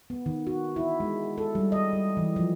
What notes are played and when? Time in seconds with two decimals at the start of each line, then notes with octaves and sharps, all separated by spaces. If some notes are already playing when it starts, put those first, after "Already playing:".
0.10 B3
0.26 D#3
0.47 F#4
0.76 E4
1.00 G#3
1.38 A4
1.55 G3
1.72 D#5
1.93 G3
2.17 E3
2.36 F3